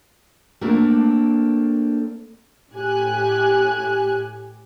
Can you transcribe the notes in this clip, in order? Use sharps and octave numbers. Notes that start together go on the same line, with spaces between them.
A3 A#3 C4 D4 A#4
A2 G4 G#5 F#6